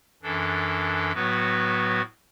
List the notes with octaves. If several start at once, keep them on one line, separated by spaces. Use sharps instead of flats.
F#2 E3 D4 A4
A2 F#3 B3 F#4 B4